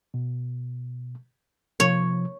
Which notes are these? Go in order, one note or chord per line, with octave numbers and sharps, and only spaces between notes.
B2
C3 F3 C#5